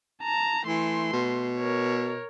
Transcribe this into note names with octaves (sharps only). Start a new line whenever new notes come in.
A5 A#5
E3 A3 C6
B2
A#4 C#5